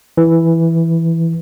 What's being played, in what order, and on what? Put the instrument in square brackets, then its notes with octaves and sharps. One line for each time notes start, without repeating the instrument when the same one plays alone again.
[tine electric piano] E3